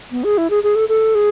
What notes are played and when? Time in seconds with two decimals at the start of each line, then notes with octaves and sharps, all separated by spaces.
0.11 B3
0.24 G#4
0.38 E4
0.50 G#4
0.63 G#4
0.76 A4
0.89 A4
1.15 G#4